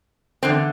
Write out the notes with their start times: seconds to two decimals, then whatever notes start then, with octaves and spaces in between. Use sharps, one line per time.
0.43 E2 D3 C4